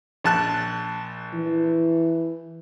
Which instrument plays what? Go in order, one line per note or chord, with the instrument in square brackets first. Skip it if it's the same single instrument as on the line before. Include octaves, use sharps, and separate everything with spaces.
[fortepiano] A#1 A5 F#6
[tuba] E3